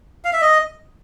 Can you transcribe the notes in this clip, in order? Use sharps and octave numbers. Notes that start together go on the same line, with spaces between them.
F5
E5
D#5